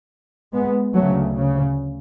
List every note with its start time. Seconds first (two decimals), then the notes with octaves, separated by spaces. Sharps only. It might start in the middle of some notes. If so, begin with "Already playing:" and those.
0.53 G#3 B3
0.94 D2 C#3 F#3 A3
1.35 C#3